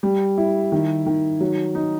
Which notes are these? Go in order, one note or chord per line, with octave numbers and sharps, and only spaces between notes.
G3
E4
D#3
D#3
F#3
D#4